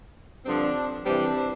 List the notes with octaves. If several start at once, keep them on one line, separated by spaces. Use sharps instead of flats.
G2 D3 F3 C4 D4
C3 E3 G3 C4 D4